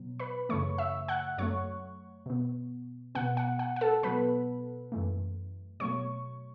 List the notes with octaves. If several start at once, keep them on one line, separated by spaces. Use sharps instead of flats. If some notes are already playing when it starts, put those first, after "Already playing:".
Already playing: B2 F#3 B3
B4 B5
F#2 C#3 E3 A3 C#5 C#6
E5 E6
F#5 F#6
F#2 F#3 A3 C#5 C#6
B2 B3
B2 B3 F#5
F#5
F#5
F#5
A4 A5
B2 F#3 B3 B4 B5
F#2 E3 A3
B2 F#3 A3 C#5 C#6